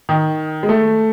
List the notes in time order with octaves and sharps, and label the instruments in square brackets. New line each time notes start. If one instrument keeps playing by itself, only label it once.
[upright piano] D#3
G#3
A3